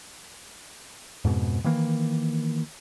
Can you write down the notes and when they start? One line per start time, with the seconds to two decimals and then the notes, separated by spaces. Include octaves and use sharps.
1.25 F2 G#2 B2
1.64 D#3 E3 A#3